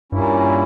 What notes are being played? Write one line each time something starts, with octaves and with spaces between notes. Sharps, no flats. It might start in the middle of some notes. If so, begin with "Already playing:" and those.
G2 A#2 G3 A#3 C#4 E4